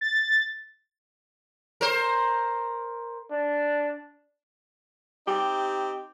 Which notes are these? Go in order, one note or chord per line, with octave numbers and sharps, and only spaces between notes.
A6
A#4 C5
D4
C4 D#4 G4